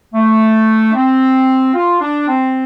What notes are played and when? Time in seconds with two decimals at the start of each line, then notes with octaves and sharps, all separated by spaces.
0.14 A3
0.89 D4
0.95 C4
1.74 F4
2.01 D4
2.28 C4